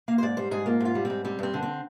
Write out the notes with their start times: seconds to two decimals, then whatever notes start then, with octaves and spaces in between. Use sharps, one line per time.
0.08 A#3 F5
0.18 C5
0.23 G#2 D5
0.37 G3 C5
0.51 G#2 G#4
0.66 A#3 F4
0.80 G#2 F4
0.95 G3
1.05 C4
1.10 G#2
1.25 G3 C4
1.39 G2 C4
1.54 D3
1.63 C4